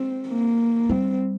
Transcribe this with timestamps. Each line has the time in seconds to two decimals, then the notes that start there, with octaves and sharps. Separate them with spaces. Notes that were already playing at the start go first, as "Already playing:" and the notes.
Already playing: G#3 C4
0.28 A#3
0.89 G3 C4